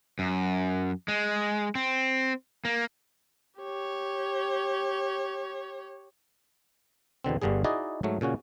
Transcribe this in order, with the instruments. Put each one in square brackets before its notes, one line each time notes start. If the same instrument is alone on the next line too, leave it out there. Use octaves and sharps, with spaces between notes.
[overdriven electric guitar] F#2
G#3
C4
A#3
[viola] G4 C#5
[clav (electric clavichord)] E2 B2 D3 C4
G1 G2 D3 G3 G#4
D#4 E4 F#4 G#4 D5 D#5
G#2 F#3 A3
A#2 C#3 C#4 F#4